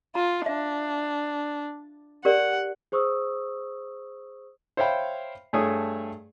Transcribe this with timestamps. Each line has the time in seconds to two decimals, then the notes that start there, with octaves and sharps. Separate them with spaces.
0.15 F4 A#5
0.46 D4 E5
2.25 G4 A#4 D5 F#5
2.92 G#4 C5 C#6 D#6 E6
4.77 C5 C#5 E5 F5 G5 B5
5.53 G2 A3 G#4 C#5 D#6